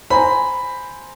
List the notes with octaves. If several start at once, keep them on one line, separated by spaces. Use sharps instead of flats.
C5 G#5 A#5 B5